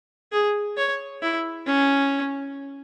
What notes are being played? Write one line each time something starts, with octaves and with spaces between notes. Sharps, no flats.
G#4
C#5
E4
C#4